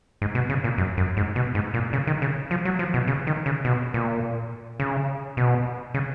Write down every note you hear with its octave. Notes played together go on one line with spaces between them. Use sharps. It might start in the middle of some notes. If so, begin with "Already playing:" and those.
G#2
B2
C#3
A#2
F#2
F#2
G#2
B2
G#2
A#2
C#3
D#3
C#3
F3
F#3
F3
B2
C#3
D#3
C#3
B2
A#2
C#3
B2
C#3